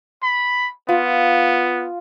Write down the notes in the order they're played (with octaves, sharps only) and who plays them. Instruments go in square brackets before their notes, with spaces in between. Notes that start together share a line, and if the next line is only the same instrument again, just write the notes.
[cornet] B5
[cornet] B3 [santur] F4